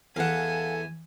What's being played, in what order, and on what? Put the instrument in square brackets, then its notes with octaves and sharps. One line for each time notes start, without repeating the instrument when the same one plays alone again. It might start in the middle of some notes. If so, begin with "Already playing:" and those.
[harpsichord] E2 E3 [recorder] A4 [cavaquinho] F5 F#5 [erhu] G#5